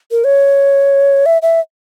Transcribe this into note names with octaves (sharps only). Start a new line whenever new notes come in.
A#4
C#5
E5
E5